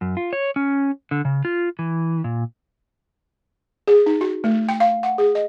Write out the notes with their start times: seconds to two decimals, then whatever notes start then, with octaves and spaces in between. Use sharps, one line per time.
0.01 F#2
0.17 F4
0.33 C#5
0.56 C#4
1.11 D3
1.25 C#3
1.45 F4
1.79 E3
2.24 A#2
3.88 G#4
4.06 D#4
4.21 F#4
4.44 A3
4.69 G5
4.80 F5
5.03 F#5
5.18 G#4
5.35 D#5